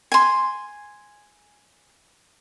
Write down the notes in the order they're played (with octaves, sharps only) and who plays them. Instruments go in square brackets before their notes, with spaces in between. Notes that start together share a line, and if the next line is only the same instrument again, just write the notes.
[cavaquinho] G#5 C6